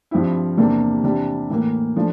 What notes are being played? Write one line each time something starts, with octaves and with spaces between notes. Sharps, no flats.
G2 F3 C4 E4
E2 C3 G3 A#3 D4
C3 E3 G3 D4
A2 E3 A#3
F3 A3 D4